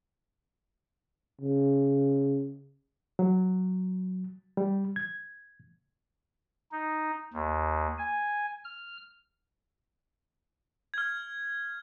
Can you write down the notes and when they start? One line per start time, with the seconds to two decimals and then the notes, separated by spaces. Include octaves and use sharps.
1.40 C#3
3.19 F#3
4.57 G3
4.96 G#6
6.72 D#4
7.33 D#2
7.98 G#5
8.64 F6
10.94 F6 G#6